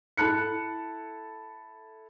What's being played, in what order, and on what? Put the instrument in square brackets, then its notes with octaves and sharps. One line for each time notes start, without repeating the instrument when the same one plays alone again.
[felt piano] E4 A4 A5 F#6 C#7